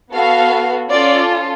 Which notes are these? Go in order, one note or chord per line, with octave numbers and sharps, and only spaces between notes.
B3 F#4 A4 F5
C#4 F4 A4 D5